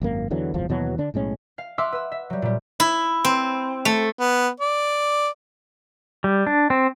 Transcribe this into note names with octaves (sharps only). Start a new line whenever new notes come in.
G#1 F#2 A#3
E2 D3 E3 F#3
D1 G1 E2 F3
D#2 B2 E3 F#3
D3 D4
B1 A2 G#3 C#4
F5
E5 F#5 C6 D6 E6 F6
B4 E6
E5
F#3 G3
A#2 G3
E4
C4
A3
B3
D5
G3
D4
C4